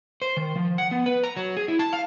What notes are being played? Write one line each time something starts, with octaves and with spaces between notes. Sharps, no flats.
C5
D#3
F3
F#5
B3
B4
A#5
F#3
G#4
E4
A5
F5